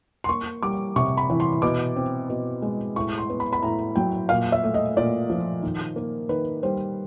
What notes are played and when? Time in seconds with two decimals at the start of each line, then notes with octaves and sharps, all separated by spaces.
0.24 C6
0.29 A#3 C#6
0.63 G3 D6
0.96 C3 C#6
1.17 B5
1.30 E3
1.40 C6
1.62 B2 D6
1.96 C4
2.29 B2
2.62 G#3
2.96 A2 C#6
3.18 C6
3.30 B3
3.40 B5
3.53 B5
3.63 A2 A#5
3.96 F#3 G5
4.29 A#2 F5
4.52 E5
4.63 A3
4.74 D#5
4.97 A#2 D5
5.30 F3
5.62 D#3
5.96 A#3
6.29 D#3 B4
6.63 G3 C5